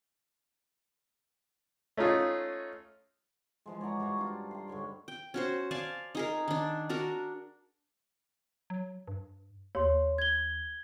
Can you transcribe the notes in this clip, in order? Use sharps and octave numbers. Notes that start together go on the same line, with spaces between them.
A3 C#4 D#4 F4 G#4
E3 F3 G#3
C#5 D5 F#5 A#5
G2 F#4 C#5 F5
D4 F4
G5 A#5 C6
G#2 D3 C#5 B5
G5
C#4 F#4 C5
D5 F5 G#5 A5
D#4 G#4 A#4
D#3 D4
D4 F#4 A#4
F#3
G2
D#2 C#5 C6
G#6 G7